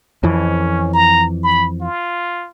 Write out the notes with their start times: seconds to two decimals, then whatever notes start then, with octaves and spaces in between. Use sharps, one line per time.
0.23 F2 E3 C#4
0.93 A#5
1.44 B5
1.81 F4